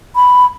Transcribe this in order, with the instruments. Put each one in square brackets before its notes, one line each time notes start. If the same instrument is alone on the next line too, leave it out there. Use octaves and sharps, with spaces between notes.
[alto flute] B5